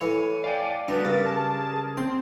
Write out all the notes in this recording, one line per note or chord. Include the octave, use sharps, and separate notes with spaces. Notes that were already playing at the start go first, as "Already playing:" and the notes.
A2 E3 C#5 G#5
D5 F5 G5
G3 A3 B3 D4 D#4 F#4 B4
G2 C#3 A#4 A6
G#4 A#4 A5
C4 C6